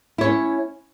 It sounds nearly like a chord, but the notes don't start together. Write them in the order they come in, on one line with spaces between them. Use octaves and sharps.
E4 C#5 C#4